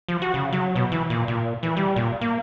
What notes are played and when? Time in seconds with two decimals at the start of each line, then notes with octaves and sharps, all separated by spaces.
0.08 F3
0.22 F#4
0.34 C#3
0.53 F#3
0.76 B2
0.92 E3
1.10 A#2
1.28 A#2
1.63 E3
1.77 G3
1.96 A#2
2.21 A#3